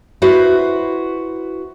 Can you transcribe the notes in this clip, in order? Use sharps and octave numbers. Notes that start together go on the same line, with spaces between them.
E4 F#4 B4 C5